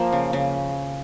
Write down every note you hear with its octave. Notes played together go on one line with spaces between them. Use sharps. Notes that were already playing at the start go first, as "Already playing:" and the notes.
Already playing: F3 A#3
C#3
C#3